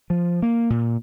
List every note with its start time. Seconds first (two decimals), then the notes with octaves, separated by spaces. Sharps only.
0.10 F3
0.42 A#3
0.70 A#2